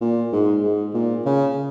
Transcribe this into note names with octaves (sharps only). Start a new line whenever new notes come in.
A#2
G#2
G#2
A#2
C#3